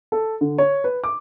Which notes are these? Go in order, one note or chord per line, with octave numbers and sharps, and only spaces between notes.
A4
D3
C#5
B4
D6